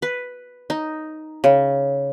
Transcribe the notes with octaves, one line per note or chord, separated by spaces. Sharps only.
B4
D#4
C#3